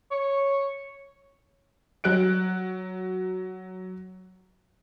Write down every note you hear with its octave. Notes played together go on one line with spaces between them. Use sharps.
C#5
F#3 F#6 D7